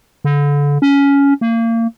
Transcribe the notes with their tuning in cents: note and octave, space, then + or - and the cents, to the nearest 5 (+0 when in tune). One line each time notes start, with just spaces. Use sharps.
D3 -30
C#4 +15
A#3 -30